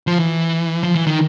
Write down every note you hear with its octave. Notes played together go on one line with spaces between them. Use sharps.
F3
E3
F3
E3
D#3